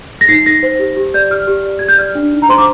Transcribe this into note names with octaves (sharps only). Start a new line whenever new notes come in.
A#6
D#4 C7
D#4 A#6
C5
G4
G4
D5 G6
G4 F6
G4
D5
G4 G#6
G6
D5 F6
D4
D#4
A#5
C5 C6
D6